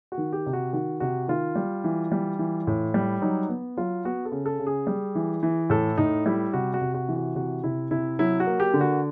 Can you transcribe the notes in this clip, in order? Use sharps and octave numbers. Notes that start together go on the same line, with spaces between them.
F#4
D#3
G4
C3
F#4
D#3 F#4
C3 F#4
D#3 F4
G3
E3
G3
E3
A2
G3
F#3 D#4
B3
F#3 F4
B3 F#4
A4
C#3
A4
C#3
G#4
G3
E3
E3
A2 A4
A2 D#4
G3 E4
C3 F#4
F#4
C3
F#4
E3
F#4
C3 F#4
C3 E4
C3 E4
F#3 E4
F#4
A#3
G4
D3
F#4